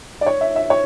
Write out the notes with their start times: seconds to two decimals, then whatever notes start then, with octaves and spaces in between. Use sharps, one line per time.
0.21 D5
0.26 C#5
0.41 E5
0.56 E5
0.70 C#5